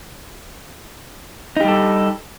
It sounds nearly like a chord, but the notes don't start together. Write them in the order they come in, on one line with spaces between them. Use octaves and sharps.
D#4 G4 G3 A4